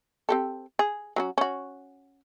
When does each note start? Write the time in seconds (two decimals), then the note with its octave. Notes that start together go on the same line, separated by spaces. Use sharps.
0.29 C4 G4 A4
0.79 G#4
1.16 F#3 C#4 F#4
1.38 C#4 F#4